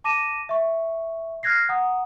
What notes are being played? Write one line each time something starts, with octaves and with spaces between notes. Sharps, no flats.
A5 D6 A#6 D#7 E7
E5 C#6
F6 F#6 G#6 A#6 C7
F#5 A#5 D#6